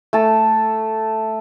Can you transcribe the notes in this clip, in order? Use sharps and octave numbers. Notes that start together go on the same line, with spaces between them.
A3 A5